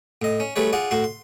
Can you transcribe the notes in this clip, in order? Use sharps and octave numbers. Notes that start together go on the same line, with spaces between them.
A2 D#5
C#4
G3 A3 G#4 B4 C#5
F4 G#4 D5 F#5
A2 F#4 C6
C6